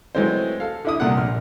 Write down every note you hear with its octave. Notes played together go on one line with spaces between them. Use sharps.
E3 F#3 G#3 A3 C4 C5
A4 F5
D3 E4 D#6
C2 A#2 A4 F#5
A#1 F6